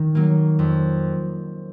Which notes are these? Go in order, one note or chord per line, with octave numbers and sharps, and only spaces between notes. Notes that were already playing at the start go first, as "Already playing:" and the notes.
Already playing: D#3
F#3 A#3
F2